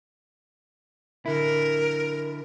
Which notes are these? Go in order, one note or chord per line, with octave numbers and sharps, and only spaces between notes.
D3 E4 A#4